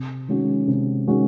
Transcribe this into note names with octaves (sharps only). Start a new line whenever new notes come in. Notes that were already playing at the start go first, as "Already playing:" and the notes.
Already playing: C3
D#3 G#3 C#4 F#4
C3
D#3 G#3 C#4 F#4